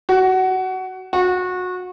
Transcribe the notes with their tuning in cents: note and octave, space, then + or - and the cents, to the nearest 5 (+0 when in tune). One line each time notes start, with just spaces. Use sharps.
F#4 +20
F#4 -25